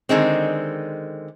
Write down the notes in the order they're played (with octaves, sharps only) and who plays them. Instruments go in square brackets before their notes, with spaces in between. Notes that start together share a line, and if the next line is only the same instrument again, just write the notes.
[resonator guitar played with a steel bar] D3 D#3 G#3 C4